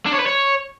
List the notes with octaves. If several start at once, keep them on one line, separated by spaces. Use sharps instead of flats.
D4
C#5
B4
C#5